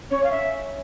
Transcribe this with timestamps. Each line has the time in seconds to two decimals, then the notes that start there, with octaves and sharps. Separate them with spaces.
0.11 C#4 C#5
0.24 F5
0.31 E5